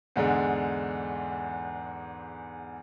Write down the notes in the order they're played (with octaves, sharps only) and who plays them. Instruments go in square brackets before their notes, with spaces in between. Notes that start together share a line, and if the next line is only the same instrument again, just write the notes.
[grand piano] E2 G#2 D3 G#3